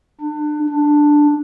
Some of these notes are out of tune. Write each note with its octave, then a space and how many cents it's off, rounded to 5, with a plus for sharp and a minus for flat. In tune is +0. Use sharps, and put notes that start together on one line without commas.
D4 +30
D4 +5